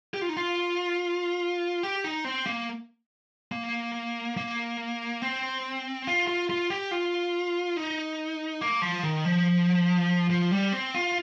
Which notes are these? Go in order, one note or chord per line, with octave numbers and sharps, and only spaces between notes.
G4
F4
D#4
F4
G4
D#4
C4
A#3
A#3
A#3
C4
F4
F4
F4
G4
F4
D#4
A#3
F3
D#3
F3
F3
G3
C4
F4